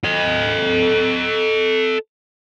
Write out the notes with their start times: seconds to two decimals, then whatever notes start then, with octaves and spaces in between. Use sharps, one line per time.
0.05 A4 D#5